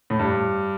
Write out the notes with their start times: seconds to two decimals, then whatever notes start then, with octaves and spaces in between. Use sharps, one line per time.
0.10 A2
0.19 G2